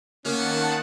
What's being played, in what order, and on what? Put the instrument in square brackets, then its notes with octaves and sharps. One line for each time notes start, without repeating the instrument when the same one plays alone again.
[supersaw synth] D#3 F#5 A5 [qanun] A#3 F5 [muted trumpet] B3 [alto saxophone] C#4